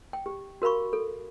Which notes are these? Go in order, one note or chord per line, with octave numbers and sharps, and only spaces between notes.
G5
G4
F#4 A#4 F5 B5 C#6
A4